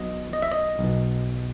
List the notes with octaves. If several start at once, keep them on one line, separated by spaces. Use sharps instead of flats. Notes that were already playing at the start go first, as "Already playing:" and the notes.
Already playing: B1 B2 D#5
D#5
E5
D#5
B1 B2